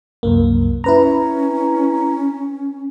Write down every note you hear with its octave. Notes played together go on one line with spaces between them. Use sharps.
C2 F#2 A#3
C#4 E4 B4 A#5